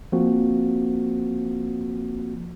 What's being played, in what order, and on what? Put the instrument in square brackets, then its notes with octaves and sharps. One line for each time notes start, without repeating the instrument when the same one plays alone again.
[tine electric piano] F3 A#3 C4 F#4